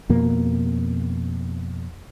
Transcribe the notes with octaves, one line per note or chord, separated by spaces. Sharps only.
F2 B2 A#3